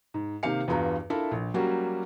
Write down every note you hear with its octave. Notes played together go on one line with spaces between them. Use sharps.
G#2
C3 D#3 A#3 G4 F5 C#7
E2 G2 B3 F4 F#4 A#5
D4 E4 F4 A4 A#4 E5
A#1
F#3 G3 A#3 C#4 F#4 G4